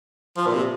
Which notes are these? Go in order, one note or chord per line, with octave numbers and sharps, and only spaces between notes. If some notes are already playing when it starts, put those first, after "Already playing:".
F3
A#2
C3